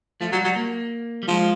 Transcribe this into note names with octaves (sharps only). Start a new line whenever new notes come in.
F3 A3
F#3 G3
F#3 G3
A#3
G3
F3 G#3